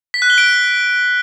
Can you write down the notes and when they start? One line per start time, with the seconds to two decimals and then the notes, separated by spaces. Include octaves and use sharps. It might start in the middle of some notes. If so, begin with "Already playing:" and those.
0.14 B6
0.22 F#6
0.30 G7
0.38 D7